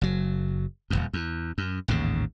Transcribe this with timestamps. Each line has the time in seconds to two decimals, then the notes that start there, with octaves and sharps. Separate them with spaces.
0.01 F#1 F#3
0.90 D#1 G#1 F2
1.13 E2
1.58 F#2
1.88 A1 D#2 G#2 C#3